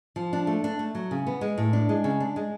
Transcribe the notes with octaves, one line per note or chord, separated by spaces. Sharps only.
F3
D4
A3
D4
A3
F#3
C#3
B3
G#3
A2
D4
G#3
C#3
D4
G#3